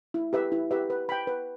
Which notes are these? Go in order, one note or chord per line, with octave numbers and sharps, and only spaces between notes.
E4
G4 B4 E5
E4
G4 B4 E5
B4
G5 B5
B4